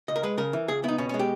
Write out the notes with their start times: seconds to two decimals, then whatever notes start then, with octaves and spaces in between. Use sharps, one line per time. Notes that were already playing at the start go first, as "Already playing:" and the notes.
0.08 C#2 D#5
0.16 A#4
0.23 G#3 B4
0.38 C#3 A#4
0.53 E3
0.68 C#2 G#4
0.84 B3 E4
0.88 D#4
0.98 B2 C#4
1.09 G#3 C#4
1.19 G4